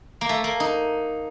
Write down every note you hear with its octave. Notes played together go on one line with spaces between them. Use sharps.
A#3
A3
A#3
D#4